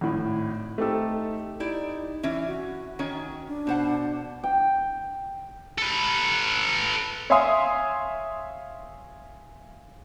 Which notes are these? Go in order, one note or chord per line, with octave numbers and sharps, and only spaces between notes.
G#1 A2
A3 C4 D#4 G4 A4
D#4 E4 G4 D5
E3 C#4 E5
F#4
D#3 C#4 C#5
D4
B2 C5 F#5
G5
A4 B4
C#5 E5 F5 G#5 C6 D#6